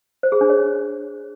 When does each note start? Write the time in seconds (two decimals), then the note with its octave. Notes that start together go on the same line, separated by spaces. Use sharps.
0.23 C5
0.32 G#4
0.41 D4
0.50 C#5